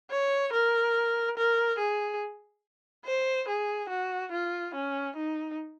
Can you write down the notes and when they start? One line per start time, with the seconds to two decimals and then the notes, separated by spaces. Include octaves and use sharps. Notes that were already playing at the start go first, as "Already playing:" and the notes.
0.10 C#5
0.53 A#4
1.37 A#4
1.79 G#4
3.05 C5
3.48 G#4
3.89 F#4
4.32 F4
4.74 C#4
5.16 D#4